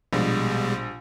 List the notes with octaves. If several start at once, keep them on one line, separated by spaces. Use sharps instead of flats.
A#1 B2 G3 G#3